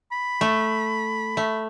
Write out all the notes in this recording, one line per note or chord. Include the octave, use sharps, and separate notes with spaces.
B5
A3
A3